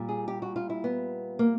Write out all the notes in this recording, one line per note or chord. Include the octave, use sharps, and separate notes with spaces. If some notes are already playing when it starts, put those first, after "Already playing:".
Already playing: A#2 G3
G#4
G4
F#4
F4
E4
B3
A#3